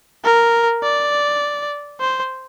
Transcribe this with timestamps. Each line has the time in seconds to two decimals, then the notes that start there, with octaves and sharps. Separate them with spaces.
0.25 A#4
0.83 D5
2.01 C5